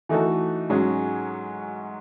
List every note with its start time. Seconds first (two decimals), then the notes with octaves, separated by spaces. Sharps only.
0.09 E3 A3 D#4 F#4 A4
0.69 G#2 F#3 C#4 G#4